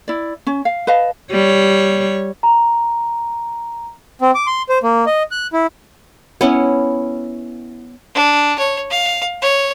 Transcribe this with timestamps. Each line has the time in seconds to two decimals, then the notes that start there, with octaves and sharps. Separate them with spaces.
0.08 E4 D5
0.47 C#4
0.65 F5
0.87 B4 D#5 F5 A5
1.32 G3 C#5
2.43 A#5
4.22 C4
4.35 D6
4.47 C6
4.69 C5
4.83 A#3
5.06 D#5
5.31 F#6
5.53 E4
6.41 B3 C#4 E4
8.15 D4
8.59 C#5
8.90 F5
9.42 C#5